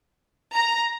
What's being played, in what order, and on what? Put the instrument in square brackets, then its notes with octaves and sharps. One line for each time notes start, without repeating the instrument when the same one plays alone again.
[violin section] A#5